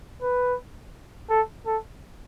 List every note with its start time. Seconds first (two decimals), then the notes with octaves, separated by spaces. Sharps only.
0.22 B4
1.30 A4
1.66 A4